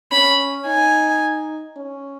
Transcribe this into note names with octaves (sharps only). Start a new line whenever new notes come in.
C#4 B5
D#4 G#5
C#4